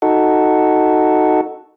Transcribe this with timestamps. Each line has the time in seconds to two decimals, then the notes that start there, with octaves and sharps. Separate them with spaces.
0.02 D#4 F#4 A4